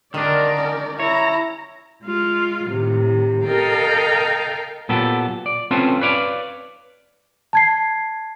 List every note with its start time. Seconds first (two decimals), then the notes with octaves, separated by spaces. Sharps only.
0.14 D3 D#3 D4 A#4 C5 D5
0.57 C#4 D#4 G5
1.00 E4 C#5 A#5
2.05 G#3 F4
2.67 A2 C3 D#3
3.46 A4 A#4 D#5 F5 G5
4.89 A#2 F#3 B3 G4 A4
5.46 D5
5.71 C4 C#4 F4 A4 B4 C5
6.01 B4 C#5 D5 F5
7.53 A5 G#6 C7